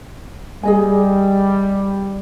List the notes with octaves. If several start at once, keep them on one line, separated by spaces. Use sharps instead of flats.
G3 G#4 D#5 G#5